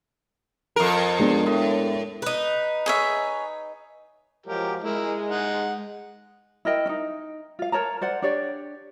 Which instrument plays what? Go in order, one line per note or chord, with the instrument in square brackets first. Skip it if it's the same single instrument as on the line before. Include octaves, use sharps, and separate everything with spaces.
[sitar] F2 A#4
[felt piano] G#3 B3 D4
[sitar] A2
[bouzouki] D#4 B4
[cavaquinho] G#4 C#5 E5
[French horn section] F3 F#3 G#3 [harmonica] G4 A#4
[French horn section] G#3 [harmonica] E4 A#4
[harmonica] D#4 F#5
[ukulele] E4 A#4 D#5 G5
C#4 D#4
F4 F5
A#4 C#5 A5 A#5
C5 D5 F#5
D4 G4 C#5 D5